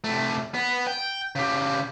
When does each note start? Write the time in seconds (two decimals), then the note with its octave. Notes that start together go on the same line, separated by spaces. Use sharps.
0.04 C3 A3
0.54 B3
0.87 G5
1.36 C#3 G4